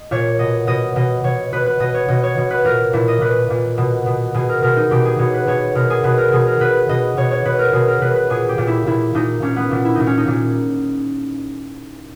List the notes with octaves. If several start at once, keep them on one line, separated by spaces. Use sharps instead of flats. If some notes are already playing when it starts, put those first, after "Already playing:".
Already playing: D#5
A#2 C#5
B2 D#5
B2 D#5
B2 D#5
B2 C#5
B2 B4
B4
B2 D#5
C#5
B2 D#5
C#5
B2
B4
A#2 A#4
A#2 E4
D#5
A#2 B4
A#2
B2
B2
B2 G#4
A#4
B2 A#4
D#4
B2 G4
G#4
B2 C#5
B4
B2 C#5
B2 A#4
G#4
B2 B4
A#4
B2 G#4
A#4
B2 B4
B2 D#5
B2 C#5
C#5
B2 B4
A#4
B2 G#4
A#4
B2 B4
B4
A#2 G#4
G4
A#2
E4
A#2 E4
A#2 D#4
A#2 C#4
B3
A#2
E4
A#2 D#4
C#4
D#4
A#2